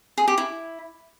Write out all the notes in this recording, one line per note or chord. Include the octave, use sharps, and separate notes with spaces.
G#4
G4
E4